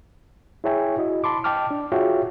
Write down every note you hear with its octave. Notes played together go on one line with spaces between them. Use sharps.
E4 G#4 C#5 E5 G5 G#5
E4 F#4 D#5
A5 B5 C6 D6
D#5 G5 A5 D6 F6
D4
F4 F#4 G#4 C#5 E5 G5